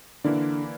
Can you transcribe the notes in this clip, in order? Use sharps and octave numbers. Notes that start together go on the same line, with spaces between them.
D3 E3 A#3 E4 A#4 D5